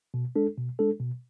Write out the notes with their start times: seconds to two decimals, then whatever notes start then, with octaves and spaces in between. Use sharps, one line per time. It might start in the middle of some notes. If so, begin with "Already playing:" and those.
0.14 B2
0.36 G#3 D4 A4
0.58 B2
0.79 G#3 D4 A4
1.00 B2